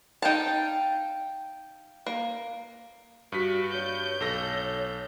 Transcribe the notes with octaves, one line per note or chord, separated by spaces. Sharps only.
D#4 F5 G5 A5
A#3
G2 F#4 B6
C#5 G6
B1 A4 A#6